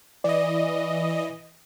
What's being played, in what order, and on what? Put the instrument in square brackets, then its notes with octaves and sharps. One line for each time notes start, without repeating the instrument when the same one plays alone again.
[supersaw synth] E3 D#5 [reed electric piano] D5